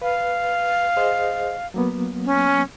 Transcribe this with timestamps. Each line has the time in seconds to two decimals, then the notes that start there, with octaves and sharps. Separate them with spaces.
0.02 B4 F5
0.97 G#4 C5 D#5
1.74 F#3 A#3 B3
2.25 C#4